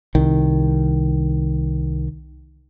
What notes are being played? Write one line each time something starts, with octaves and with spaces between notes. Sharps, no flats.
C2 D#3